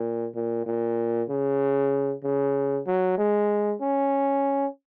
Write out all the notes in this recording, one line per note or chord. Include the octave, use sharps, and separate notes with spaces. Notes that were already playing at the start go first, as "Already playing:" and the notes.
Already playing: A#2
A#2
A#2
C#3
C#3
F#3
G#3
C#4